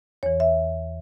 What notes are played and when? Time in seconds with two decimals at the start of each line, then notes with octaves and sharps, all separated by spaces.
0.23 E2 E3 C#5
0.40 E5